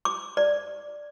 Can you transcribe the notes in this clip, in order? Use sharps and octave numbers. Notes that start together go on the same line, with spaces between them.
D6
D5